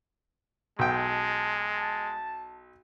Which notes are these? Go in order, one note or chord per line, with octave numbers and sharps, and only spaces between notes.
B1 G#3 G5 A5